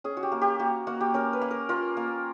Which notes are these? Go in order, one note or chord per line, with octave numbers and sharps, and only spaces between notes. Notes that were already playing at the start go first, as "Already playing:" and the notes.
C#4 G#4
F#4
G4
A#3
G4
A#3 F#4
A#3 F#4
G4
C#4 A#4
B4
A#3
A#4
F4 A#4
A#3